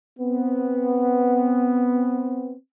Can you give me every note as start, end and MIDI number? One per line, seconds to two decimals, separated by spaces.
0.19 2.56 59
0.19 2.56 60